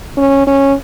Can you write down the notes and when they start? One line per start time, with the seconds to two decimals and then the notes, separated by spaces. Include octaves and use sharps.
0.17 C#4
0.47 C#4